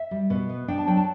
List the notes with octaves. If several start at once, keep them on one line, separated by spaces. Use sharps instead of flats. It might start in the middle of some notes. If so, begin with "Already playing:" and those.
Already playing: E5
G3
B2
B3
D4 G5
A5
F#3 G5
A5